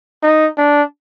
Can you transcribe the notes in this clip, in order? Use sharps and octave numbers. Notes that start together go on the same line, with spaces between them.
D#4
D4